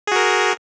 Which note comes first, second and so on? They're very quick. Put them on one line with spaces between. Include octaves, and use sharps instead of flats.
G#4 F#4 A#4